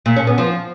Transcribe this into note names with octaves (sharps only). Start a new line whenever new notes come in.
A#2
C#4
B3
F3